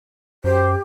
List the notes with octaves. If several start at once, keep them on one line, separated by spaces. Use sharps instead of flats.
F#2 G4 C5